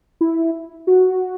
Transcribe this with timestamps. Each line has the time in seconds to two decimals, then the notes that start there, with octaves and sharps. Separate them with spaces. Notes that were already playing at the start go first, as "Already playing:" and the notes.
0.21 E4
0.87 F#4